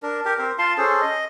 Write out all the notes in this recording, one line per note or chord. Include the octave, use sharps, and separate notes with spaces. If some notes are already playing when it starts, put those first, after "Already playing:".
D4 A#4
G4 A#4
C4 A#4 C5
F4 F5 A5 C6
C#4 G#4 A4 C5
D#5